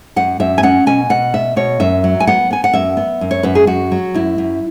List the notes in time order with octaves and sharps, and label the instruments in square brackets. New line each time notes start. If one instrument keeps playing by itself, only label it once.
[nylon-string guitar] F#2 F#5
F#2 E5
G#5
C#4 F#5
B2 G#5
B2 F#5
B3 E5
B2 C#5
F#2 E5
F#3
G#5
B3 F#5
B3 G#5
F#5
F#2 E5
B3
F#2
C#5
F#2 B4
G#4
F#2 F#4
F#3
F#2 E4
F#2